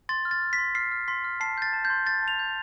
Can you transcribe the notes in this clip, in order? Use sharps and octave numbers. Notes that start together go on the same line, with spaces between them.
C6 A6
F6
A6
F6
B6
C6
F6 C7
F6
C6 B6
F6
A5 C7
G6 A6
A5
G6
C6
G6 A6
A5
F7
G6